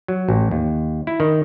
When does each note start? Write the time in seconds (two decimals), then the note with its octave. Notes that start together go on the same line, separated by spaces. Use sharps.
0.08 F#3
0.28 A1
0.51 D#2
1.07 E4
1.20 D#3